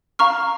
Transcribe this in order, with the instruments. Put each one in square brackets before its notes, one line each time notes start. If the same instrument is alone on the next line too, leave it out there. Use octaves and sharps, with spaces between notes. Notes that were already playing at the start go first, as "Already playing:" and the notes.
[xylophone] F5 A#5 C#6 F6